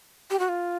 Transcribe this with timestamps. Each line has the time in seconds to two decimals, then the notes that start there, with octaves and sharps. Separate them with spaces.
0.30 G4
0.39 F#4
0.49 F4